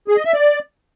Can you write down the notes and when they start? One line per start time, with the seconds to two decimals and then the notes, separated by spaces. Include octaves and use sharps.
0.08 G#4
0.16 D#5
0.25 E5
0.34 D5